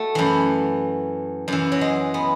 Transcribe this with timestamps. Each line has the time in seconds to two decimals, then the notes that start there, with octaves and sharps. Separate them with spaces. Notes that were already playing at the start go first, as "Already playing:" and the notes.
Already playing: A3 F#4
0.15 F#2 E3
1.48 F#2 E3
1.72 F#3
1.81 G#3
2.14 B3